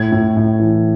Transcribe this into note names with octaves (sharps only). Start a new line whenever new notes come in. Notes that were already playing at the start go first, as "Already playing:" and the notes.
Already playing: A2 G#6
A2
A2
E3